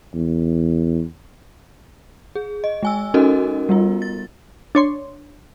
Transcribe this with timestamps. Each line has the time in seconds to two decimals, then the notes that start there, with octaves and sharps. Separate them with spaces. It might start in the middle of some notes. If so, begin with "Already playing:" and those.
0.15 E2
2.36 G#4
2.64 D#5
2.83 G#3 G#5 E6
3.14 C#4 D#4 F#4 A4 A#4 D#5
3.69 G3 B3 F4
4.02 A6
4.75 D4 C#5 C6